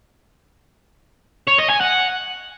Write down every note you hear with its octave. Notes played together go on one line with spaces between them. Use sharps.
C#5
D#5
G#5
F#5